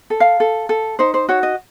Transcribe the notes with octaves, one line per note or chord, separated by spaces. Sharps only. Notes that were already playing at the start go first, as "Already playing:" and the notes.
A4
F5
A4
A4
D#4 C5
C5
F#4 C#5
D#5